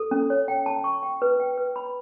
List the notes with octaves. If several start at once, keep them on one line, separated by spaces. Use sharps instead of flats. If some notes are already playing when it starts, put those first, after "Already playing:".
Already playing: A4
C#4
C#5
G5
A5
C#6
G5
B4
G5
B4
B5